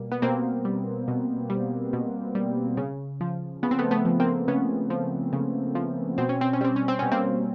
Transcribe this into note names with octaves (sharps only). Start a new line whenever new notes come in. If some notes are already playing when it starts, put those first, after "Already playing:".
Already playing: B2 G3 A#3
B3
B2 A#3 C4
G3
B2
G3
B2
G3
C#3
F3
C#3 B3
C4
A3 B3
A3 B3
F3
A#3 C4
C#3 B3 C#4
F3
C#3
F3
B2 C4
C#4
C4
C#4
G3 C4
C#4
C4
B2 C#4
A#3 C4